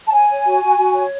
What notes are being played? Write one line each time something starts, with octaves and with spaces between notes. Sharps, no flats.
A5
C#5 G#5
C#5
F#4
F#4
F#4
C#5